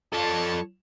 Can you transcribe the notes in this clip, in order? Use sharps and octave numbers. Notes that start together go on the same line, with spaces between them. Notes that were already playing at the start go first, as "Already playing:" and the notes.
F3 A4 C#5 D5 A5